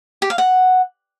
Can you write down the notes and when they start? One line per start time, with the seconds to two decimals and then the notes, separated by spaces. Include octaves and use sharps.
0.22 G4
0.30 F5
0.38 F#5